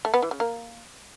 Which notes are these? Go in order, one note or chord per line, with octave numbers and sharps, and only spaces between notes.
A3
B3
E3
C#3
A#3